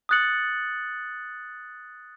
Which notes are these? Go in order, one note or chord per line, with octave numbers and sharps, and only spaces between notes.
D#6 F#6 A6 C#7 F#7